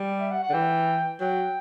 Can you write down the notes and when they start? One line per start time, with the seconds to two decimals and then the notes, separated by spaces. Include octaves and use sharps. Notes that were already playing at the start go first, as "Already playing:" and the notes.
Already playing: G3
0.20 E5
0.31 F#5
0.42 F#5
0.49 D3
0.53 E3 G5
1.21 F#3 G5